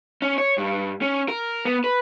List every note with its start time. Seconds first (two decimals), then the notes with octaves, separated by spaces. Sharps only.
0.22 C#4
0.38 C#5
0.58 G2
1.02 C#4
1.29 A#4
1.65 B3
1.84 B4